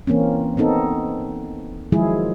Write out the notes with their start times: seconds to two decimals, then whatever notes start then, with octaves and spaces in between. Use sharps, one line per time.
0.07 E3 A#3 C4 C#4
0.57 B3 C4 D#4 A4
1.92 D#3 F3 F#3 G#3 E4 G#4